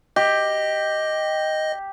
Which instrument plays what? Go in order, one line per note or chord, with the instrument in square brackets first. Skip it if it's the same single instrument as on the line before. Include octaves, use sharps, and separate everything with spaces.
[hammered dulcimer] G4 [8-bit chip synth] D#5